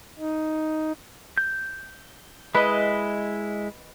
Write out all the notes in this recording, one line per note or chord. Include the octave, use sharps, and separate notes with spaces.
D#4
G6
G#3 E4 B4 D#5